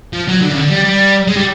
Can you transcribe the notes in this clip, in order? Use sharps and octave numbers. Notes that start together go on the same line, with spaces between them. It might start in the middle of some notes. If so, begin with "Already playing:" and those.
F3
F#3
D3
C#3
D3
G3
G3
G#3
G3